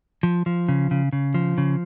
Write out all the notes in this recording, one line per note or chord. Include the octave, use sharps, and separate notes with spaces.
F3
F3
C#3
C#3
C#3
F3
C#3